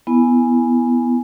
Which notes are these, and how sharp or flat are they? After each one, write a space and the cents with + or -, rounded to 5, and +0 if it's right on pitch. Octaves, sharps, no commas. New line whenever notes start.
B3 +0 E4 +0 G#5 +0